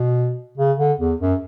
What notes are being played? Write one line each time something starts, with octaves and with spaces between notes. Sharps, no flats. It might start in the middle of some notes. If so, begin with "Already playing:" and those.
Already playing: B2
C#3
D3
E2
F#2